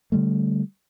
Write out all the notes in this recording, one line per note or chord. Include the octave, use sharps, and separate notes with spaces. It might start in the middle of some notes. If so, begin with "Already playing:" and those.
D3 G3 A3